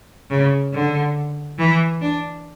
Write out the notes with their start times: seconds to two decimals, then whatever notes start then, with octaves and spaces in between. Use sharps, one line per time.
0.30 C#3
0.73 D3
1.59 E3
2.01 D4